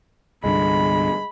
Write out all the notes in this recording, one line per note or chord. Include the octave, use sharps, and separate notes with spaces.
C2 G2 D3 G#3 B5